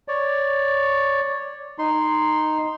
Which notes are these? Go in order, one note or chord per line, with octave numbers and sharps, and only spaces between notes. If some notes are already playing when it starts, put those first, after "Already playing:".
C#5 D5
D#4 C6